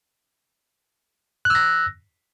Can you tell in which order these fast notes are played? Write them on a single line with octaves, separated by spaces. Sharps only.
F#6 E6 A#6